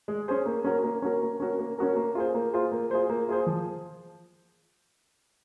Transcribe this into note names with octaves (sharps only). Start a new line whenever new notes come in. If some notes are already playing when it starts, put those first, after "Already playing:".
G#3
C#4 G#4 C5
A#3
C#4 F#4 A#4
A#3
C#4 F#4 A#4
A#3
C#4 F#4 A#4
A#3
C#4 F#4 A#4
A#3
F4 G#4 C5
A#3
F4 G#4 C5
A#3
F4 G#4 C5
A#3
F4 G#4 C5
F3